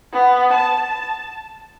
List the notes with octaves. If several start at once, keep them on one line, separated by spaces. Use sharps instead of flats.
B3
A5